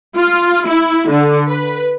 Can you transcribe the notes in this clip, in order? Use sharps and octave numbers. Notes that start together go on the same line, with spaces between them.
F4
E4
D3
B4